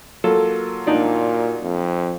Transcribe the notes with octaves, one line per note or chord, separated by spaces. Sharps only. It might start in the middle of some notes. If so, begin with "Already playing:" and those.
F#3 A#3 F4 A4
A#2 D4 D#4 D5
F2